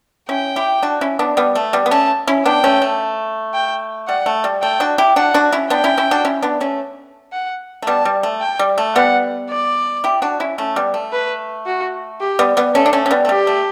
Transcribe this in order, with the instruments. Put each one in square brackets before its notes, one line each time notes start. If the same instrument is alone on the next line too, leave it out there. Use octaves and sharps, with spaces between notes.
[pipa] C#4 E4 [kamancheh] G5
[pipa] E4 G4
D4 F#4
C#4 E4
B3 D4
G3 B3
A3
G3 B3
B3
[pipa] A3 C#4 [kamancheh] A5
[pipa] C#4 E4
[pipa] B3 D4 [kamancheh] G5
[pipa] A3 C#4
A3
[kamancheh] G5
[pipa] G3 [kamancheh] F#5
[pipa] A3
G3
[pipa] A3 [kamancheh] G5
[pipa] D4 F#4
E4 G4
[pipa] D4 F#4 [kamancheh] F#5
[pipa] D4 F#4
C#4 E4
[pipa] B3 D4 [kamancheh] G5
[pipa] C#4 E4
C#4 E4
D4 F#4
C#4 E4
B3 D4
A3 C#4
[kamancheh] F#5
[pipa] A3
[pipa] G3 B3 [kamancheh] A5
[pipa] G3
A3
[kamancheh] G5
[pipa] G3
A3
[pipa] G3 B3 [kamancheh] F#5
[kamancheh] D5
[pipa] E4 G4
D4 F#4
C#4 E4
A3 C#4
G3 B3
A3
[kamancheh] B4
F#4
G4
[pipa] G3 B3
G3 B3
[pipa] A3 C#4 [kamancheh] A4
[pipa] D4
A3 C#4
C#4
G3 B3
A3
[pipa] G3 [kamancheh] G4
[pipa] A3